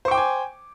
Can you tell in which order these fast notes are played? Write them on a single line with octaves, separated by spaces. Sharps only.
C5 C#6 G5 D6 G#5